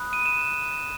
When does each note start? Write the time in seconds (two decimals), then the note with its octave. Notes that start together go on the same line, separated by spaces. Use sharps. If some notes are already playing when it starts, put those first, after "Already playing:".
Already playing: B5 D#6 F#6
0.13 D#7
0.26 E7
0.69 E7